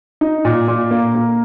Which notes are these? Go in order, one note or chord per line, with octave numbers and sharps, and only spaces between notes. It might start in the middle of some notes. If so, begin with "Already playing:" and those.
D#4
A#2
A#2
A#3
A#3